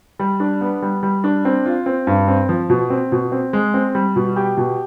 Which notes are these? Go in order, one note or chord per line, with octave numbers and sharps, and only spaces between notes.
G3
D4
B3
G3
G3
D4
C4
F4
C4
G2
C4
F3
B2
C4
B2
C4
G#3
C4
G3
B2
G4
B2